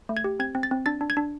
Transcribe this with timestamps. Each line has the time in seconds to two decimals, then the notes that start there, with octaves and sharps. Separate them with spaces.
0.09 A3
0.17 G#6
0.24 G4
0.40 C4 G#6
0.55 C4
0.63 A6
0.71 C4
0.86 D4 A6
1.01 D4
1.10 G#6
1.17 D4